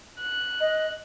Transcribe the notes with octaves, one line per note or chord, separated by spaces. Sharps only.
F#6
D#5